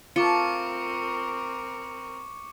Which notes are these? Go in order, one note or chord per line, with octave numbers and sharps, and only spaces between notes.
A3 C4 F4 A#4 A5 C#6 D6 C#7